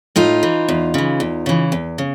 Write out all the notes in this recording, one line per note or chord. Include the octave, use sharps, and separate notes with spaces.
A2 D#4 F4
E3
E2
C#3 E3
E2
C#3 E3
E2
C#3